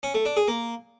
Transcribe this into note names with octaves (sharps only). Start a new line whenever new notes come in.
C#4
A3
D4
G#4
A#3